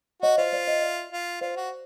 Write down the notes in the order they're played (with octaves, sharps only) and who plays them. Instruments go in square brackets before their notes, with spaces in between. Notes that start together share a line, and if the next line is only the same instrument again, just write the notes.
[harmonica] F#4 [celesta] C#5 D#5
[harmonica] F4 [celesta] C5 D5
[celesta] C5 D5
C#5 D#5
D5 E5
[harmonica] F4
[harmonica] F4 [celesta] C5 D5
[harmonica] F#4